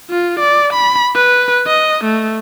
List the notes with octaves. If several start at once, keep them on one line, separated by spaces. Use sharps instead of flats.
F4
D5
B5
B4
D#5
A3